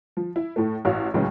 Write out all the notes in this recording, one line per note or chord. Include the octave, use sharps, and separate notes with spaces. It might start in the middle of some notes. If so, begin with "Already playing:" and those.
F3
E4
A2 A3
A1 F#4 C#5 F5
C#2 A2 C#3 E3 F#3 G#3